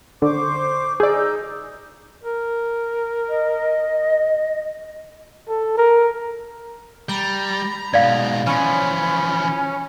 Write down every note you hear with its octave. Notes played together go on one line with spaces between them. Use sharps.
D3 C5 C#6 D6
D#4 G#4 D5 E6 G6
A#4
D#5
A4
A#4
G3 A#5 B5
G#2 B2 D5 F5
E3 F3 C#4 B5